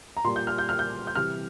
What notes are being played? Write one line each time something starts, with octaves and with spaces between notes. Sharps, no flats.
A#5
A#2 G3 C6
G6
F6
G6
F6
G6
G6
C3 E3 G3 F6